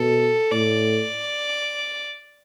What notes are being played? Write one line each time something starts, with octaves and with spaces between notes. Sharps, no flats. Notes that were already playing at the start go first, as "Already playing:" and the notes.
Already playing: B2 A4
A2 D5